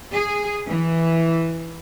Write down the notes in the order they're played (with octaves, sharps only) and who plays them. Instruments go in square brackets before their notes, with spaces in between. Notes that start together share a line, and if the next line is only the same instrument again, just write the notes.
[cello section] G#4
E3